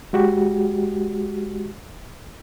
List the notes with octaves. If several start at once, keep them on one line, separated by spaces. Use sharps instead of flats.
G#3 F#4 G4